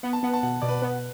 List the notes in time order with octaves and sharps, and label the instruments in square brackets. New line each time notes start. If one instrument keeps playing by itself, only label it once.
[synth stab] B3 [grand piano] F#5
[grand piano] A5
[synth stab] B3 [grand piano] F#5
[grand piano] A5
[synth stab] B2 [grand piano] F#5
[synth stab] B2 [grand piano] D5
[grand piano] B4
[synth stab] B3 [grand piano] B4